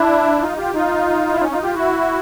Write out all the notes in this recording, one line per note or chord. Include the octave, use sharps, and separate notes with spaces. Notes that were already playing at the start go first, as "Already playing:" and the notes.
Already playing: D4 E4
D#4 F4
F4 G4
D#4 F4
E4
C#4 D#4
D#4 F4
F4 G4
E4 F#4